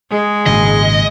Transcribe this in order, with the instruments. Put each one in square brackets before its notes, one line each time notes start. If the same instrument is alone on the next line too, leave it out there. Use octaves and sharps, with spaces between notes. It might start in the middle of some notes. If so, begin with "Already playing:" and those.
[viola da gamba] G#3 [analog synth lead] G#4
[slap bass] G#1 A#2 C#3 [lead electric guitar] D#5